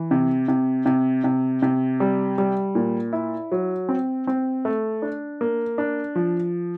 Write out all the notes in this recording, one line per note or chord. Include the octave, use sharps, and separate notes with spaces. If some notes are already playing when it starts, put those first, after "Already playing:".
Already playing: E3
C3
C3
C3
C3
C3
G3
G3
A#2
E4
F#3
C4
C4
A3
D4
A#3
D4
F3